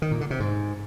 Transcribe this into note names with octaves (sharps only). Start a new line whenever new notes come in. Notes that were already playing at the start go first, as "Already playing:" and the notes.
D#3
A#2
D3
C3
G#2